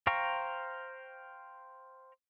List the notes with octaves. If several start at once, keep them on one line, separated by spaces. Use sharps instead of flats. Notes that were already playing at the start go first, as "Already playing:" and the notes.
C5 F5 G5 A#5 C#6